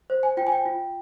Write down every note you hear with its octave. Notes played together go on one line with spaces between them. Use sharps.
C5
G#5
F4 G5
G#5
G5
F4